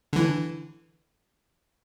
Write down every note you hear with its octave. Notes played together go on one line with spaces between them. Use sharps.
D3 E3